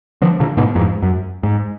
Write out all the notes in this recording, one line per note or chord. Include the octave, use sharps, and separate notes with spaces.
D3 F3
A#2 D3
G#2 B2
F2 G#2
F#2
G#2